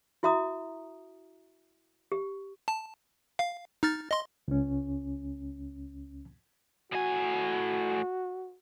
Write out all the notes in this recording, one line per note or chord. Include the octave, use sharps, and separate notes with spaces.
E4 F#4 E5 A#5 D#6
G4
A5
F5
D#4 F6 A6
D#5 C6
C#2 C#4
A2 F#4 G#5